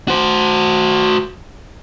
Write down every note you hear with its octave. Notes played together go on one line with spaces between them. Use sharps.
F#4 C5